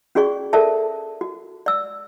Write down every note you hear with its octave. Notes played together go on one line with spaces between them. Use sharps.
C#4 F#4 G#4 D5 C#6
A4 A#4 D5 E5 A5
F#4
D5 E6